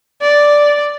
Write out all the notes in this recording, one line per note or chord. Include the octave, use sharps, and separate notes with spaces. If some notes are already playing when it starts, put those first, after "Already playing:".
D5